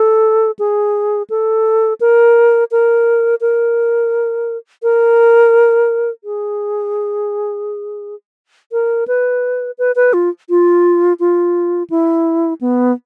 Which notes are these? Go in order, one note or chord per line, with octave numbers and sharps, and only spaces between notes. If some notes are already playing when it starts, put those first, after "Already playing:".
Already playing: A4
G#4
A4
A#4
A#4
A#4
A#4
G#4
A#4
B4
B4
B4
F4
F4
F4
E4
B3